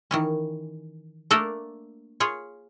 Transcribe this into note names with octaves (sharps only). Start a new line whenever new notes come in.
D#3 E3 C#4
A3 A#3 D4 A4 A#4
F4 G#4 C#5